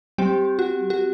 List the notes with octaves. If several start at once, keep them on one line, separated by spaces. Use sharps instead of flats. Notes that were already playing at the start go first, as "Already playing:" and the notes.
G3 C4 G4
F#4
F#4